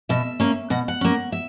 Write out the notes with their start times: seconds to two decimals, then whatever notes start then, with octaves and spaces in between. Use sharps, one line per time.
0.09 B2 E5
0.40 A#3 C#4
0.70 B2 F#5
0.88 F#5
1.01 A#3 C#4
1.32 E5